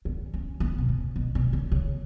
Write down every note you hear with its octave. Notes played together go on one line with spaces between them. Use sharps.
B3
C#4
B3
B2
C#3
B2
B2
C#3
C#3